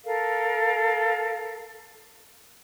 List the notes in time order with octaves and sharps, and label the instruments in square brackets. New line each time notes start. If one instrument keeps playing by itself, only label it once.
[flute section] A4 A#4 F5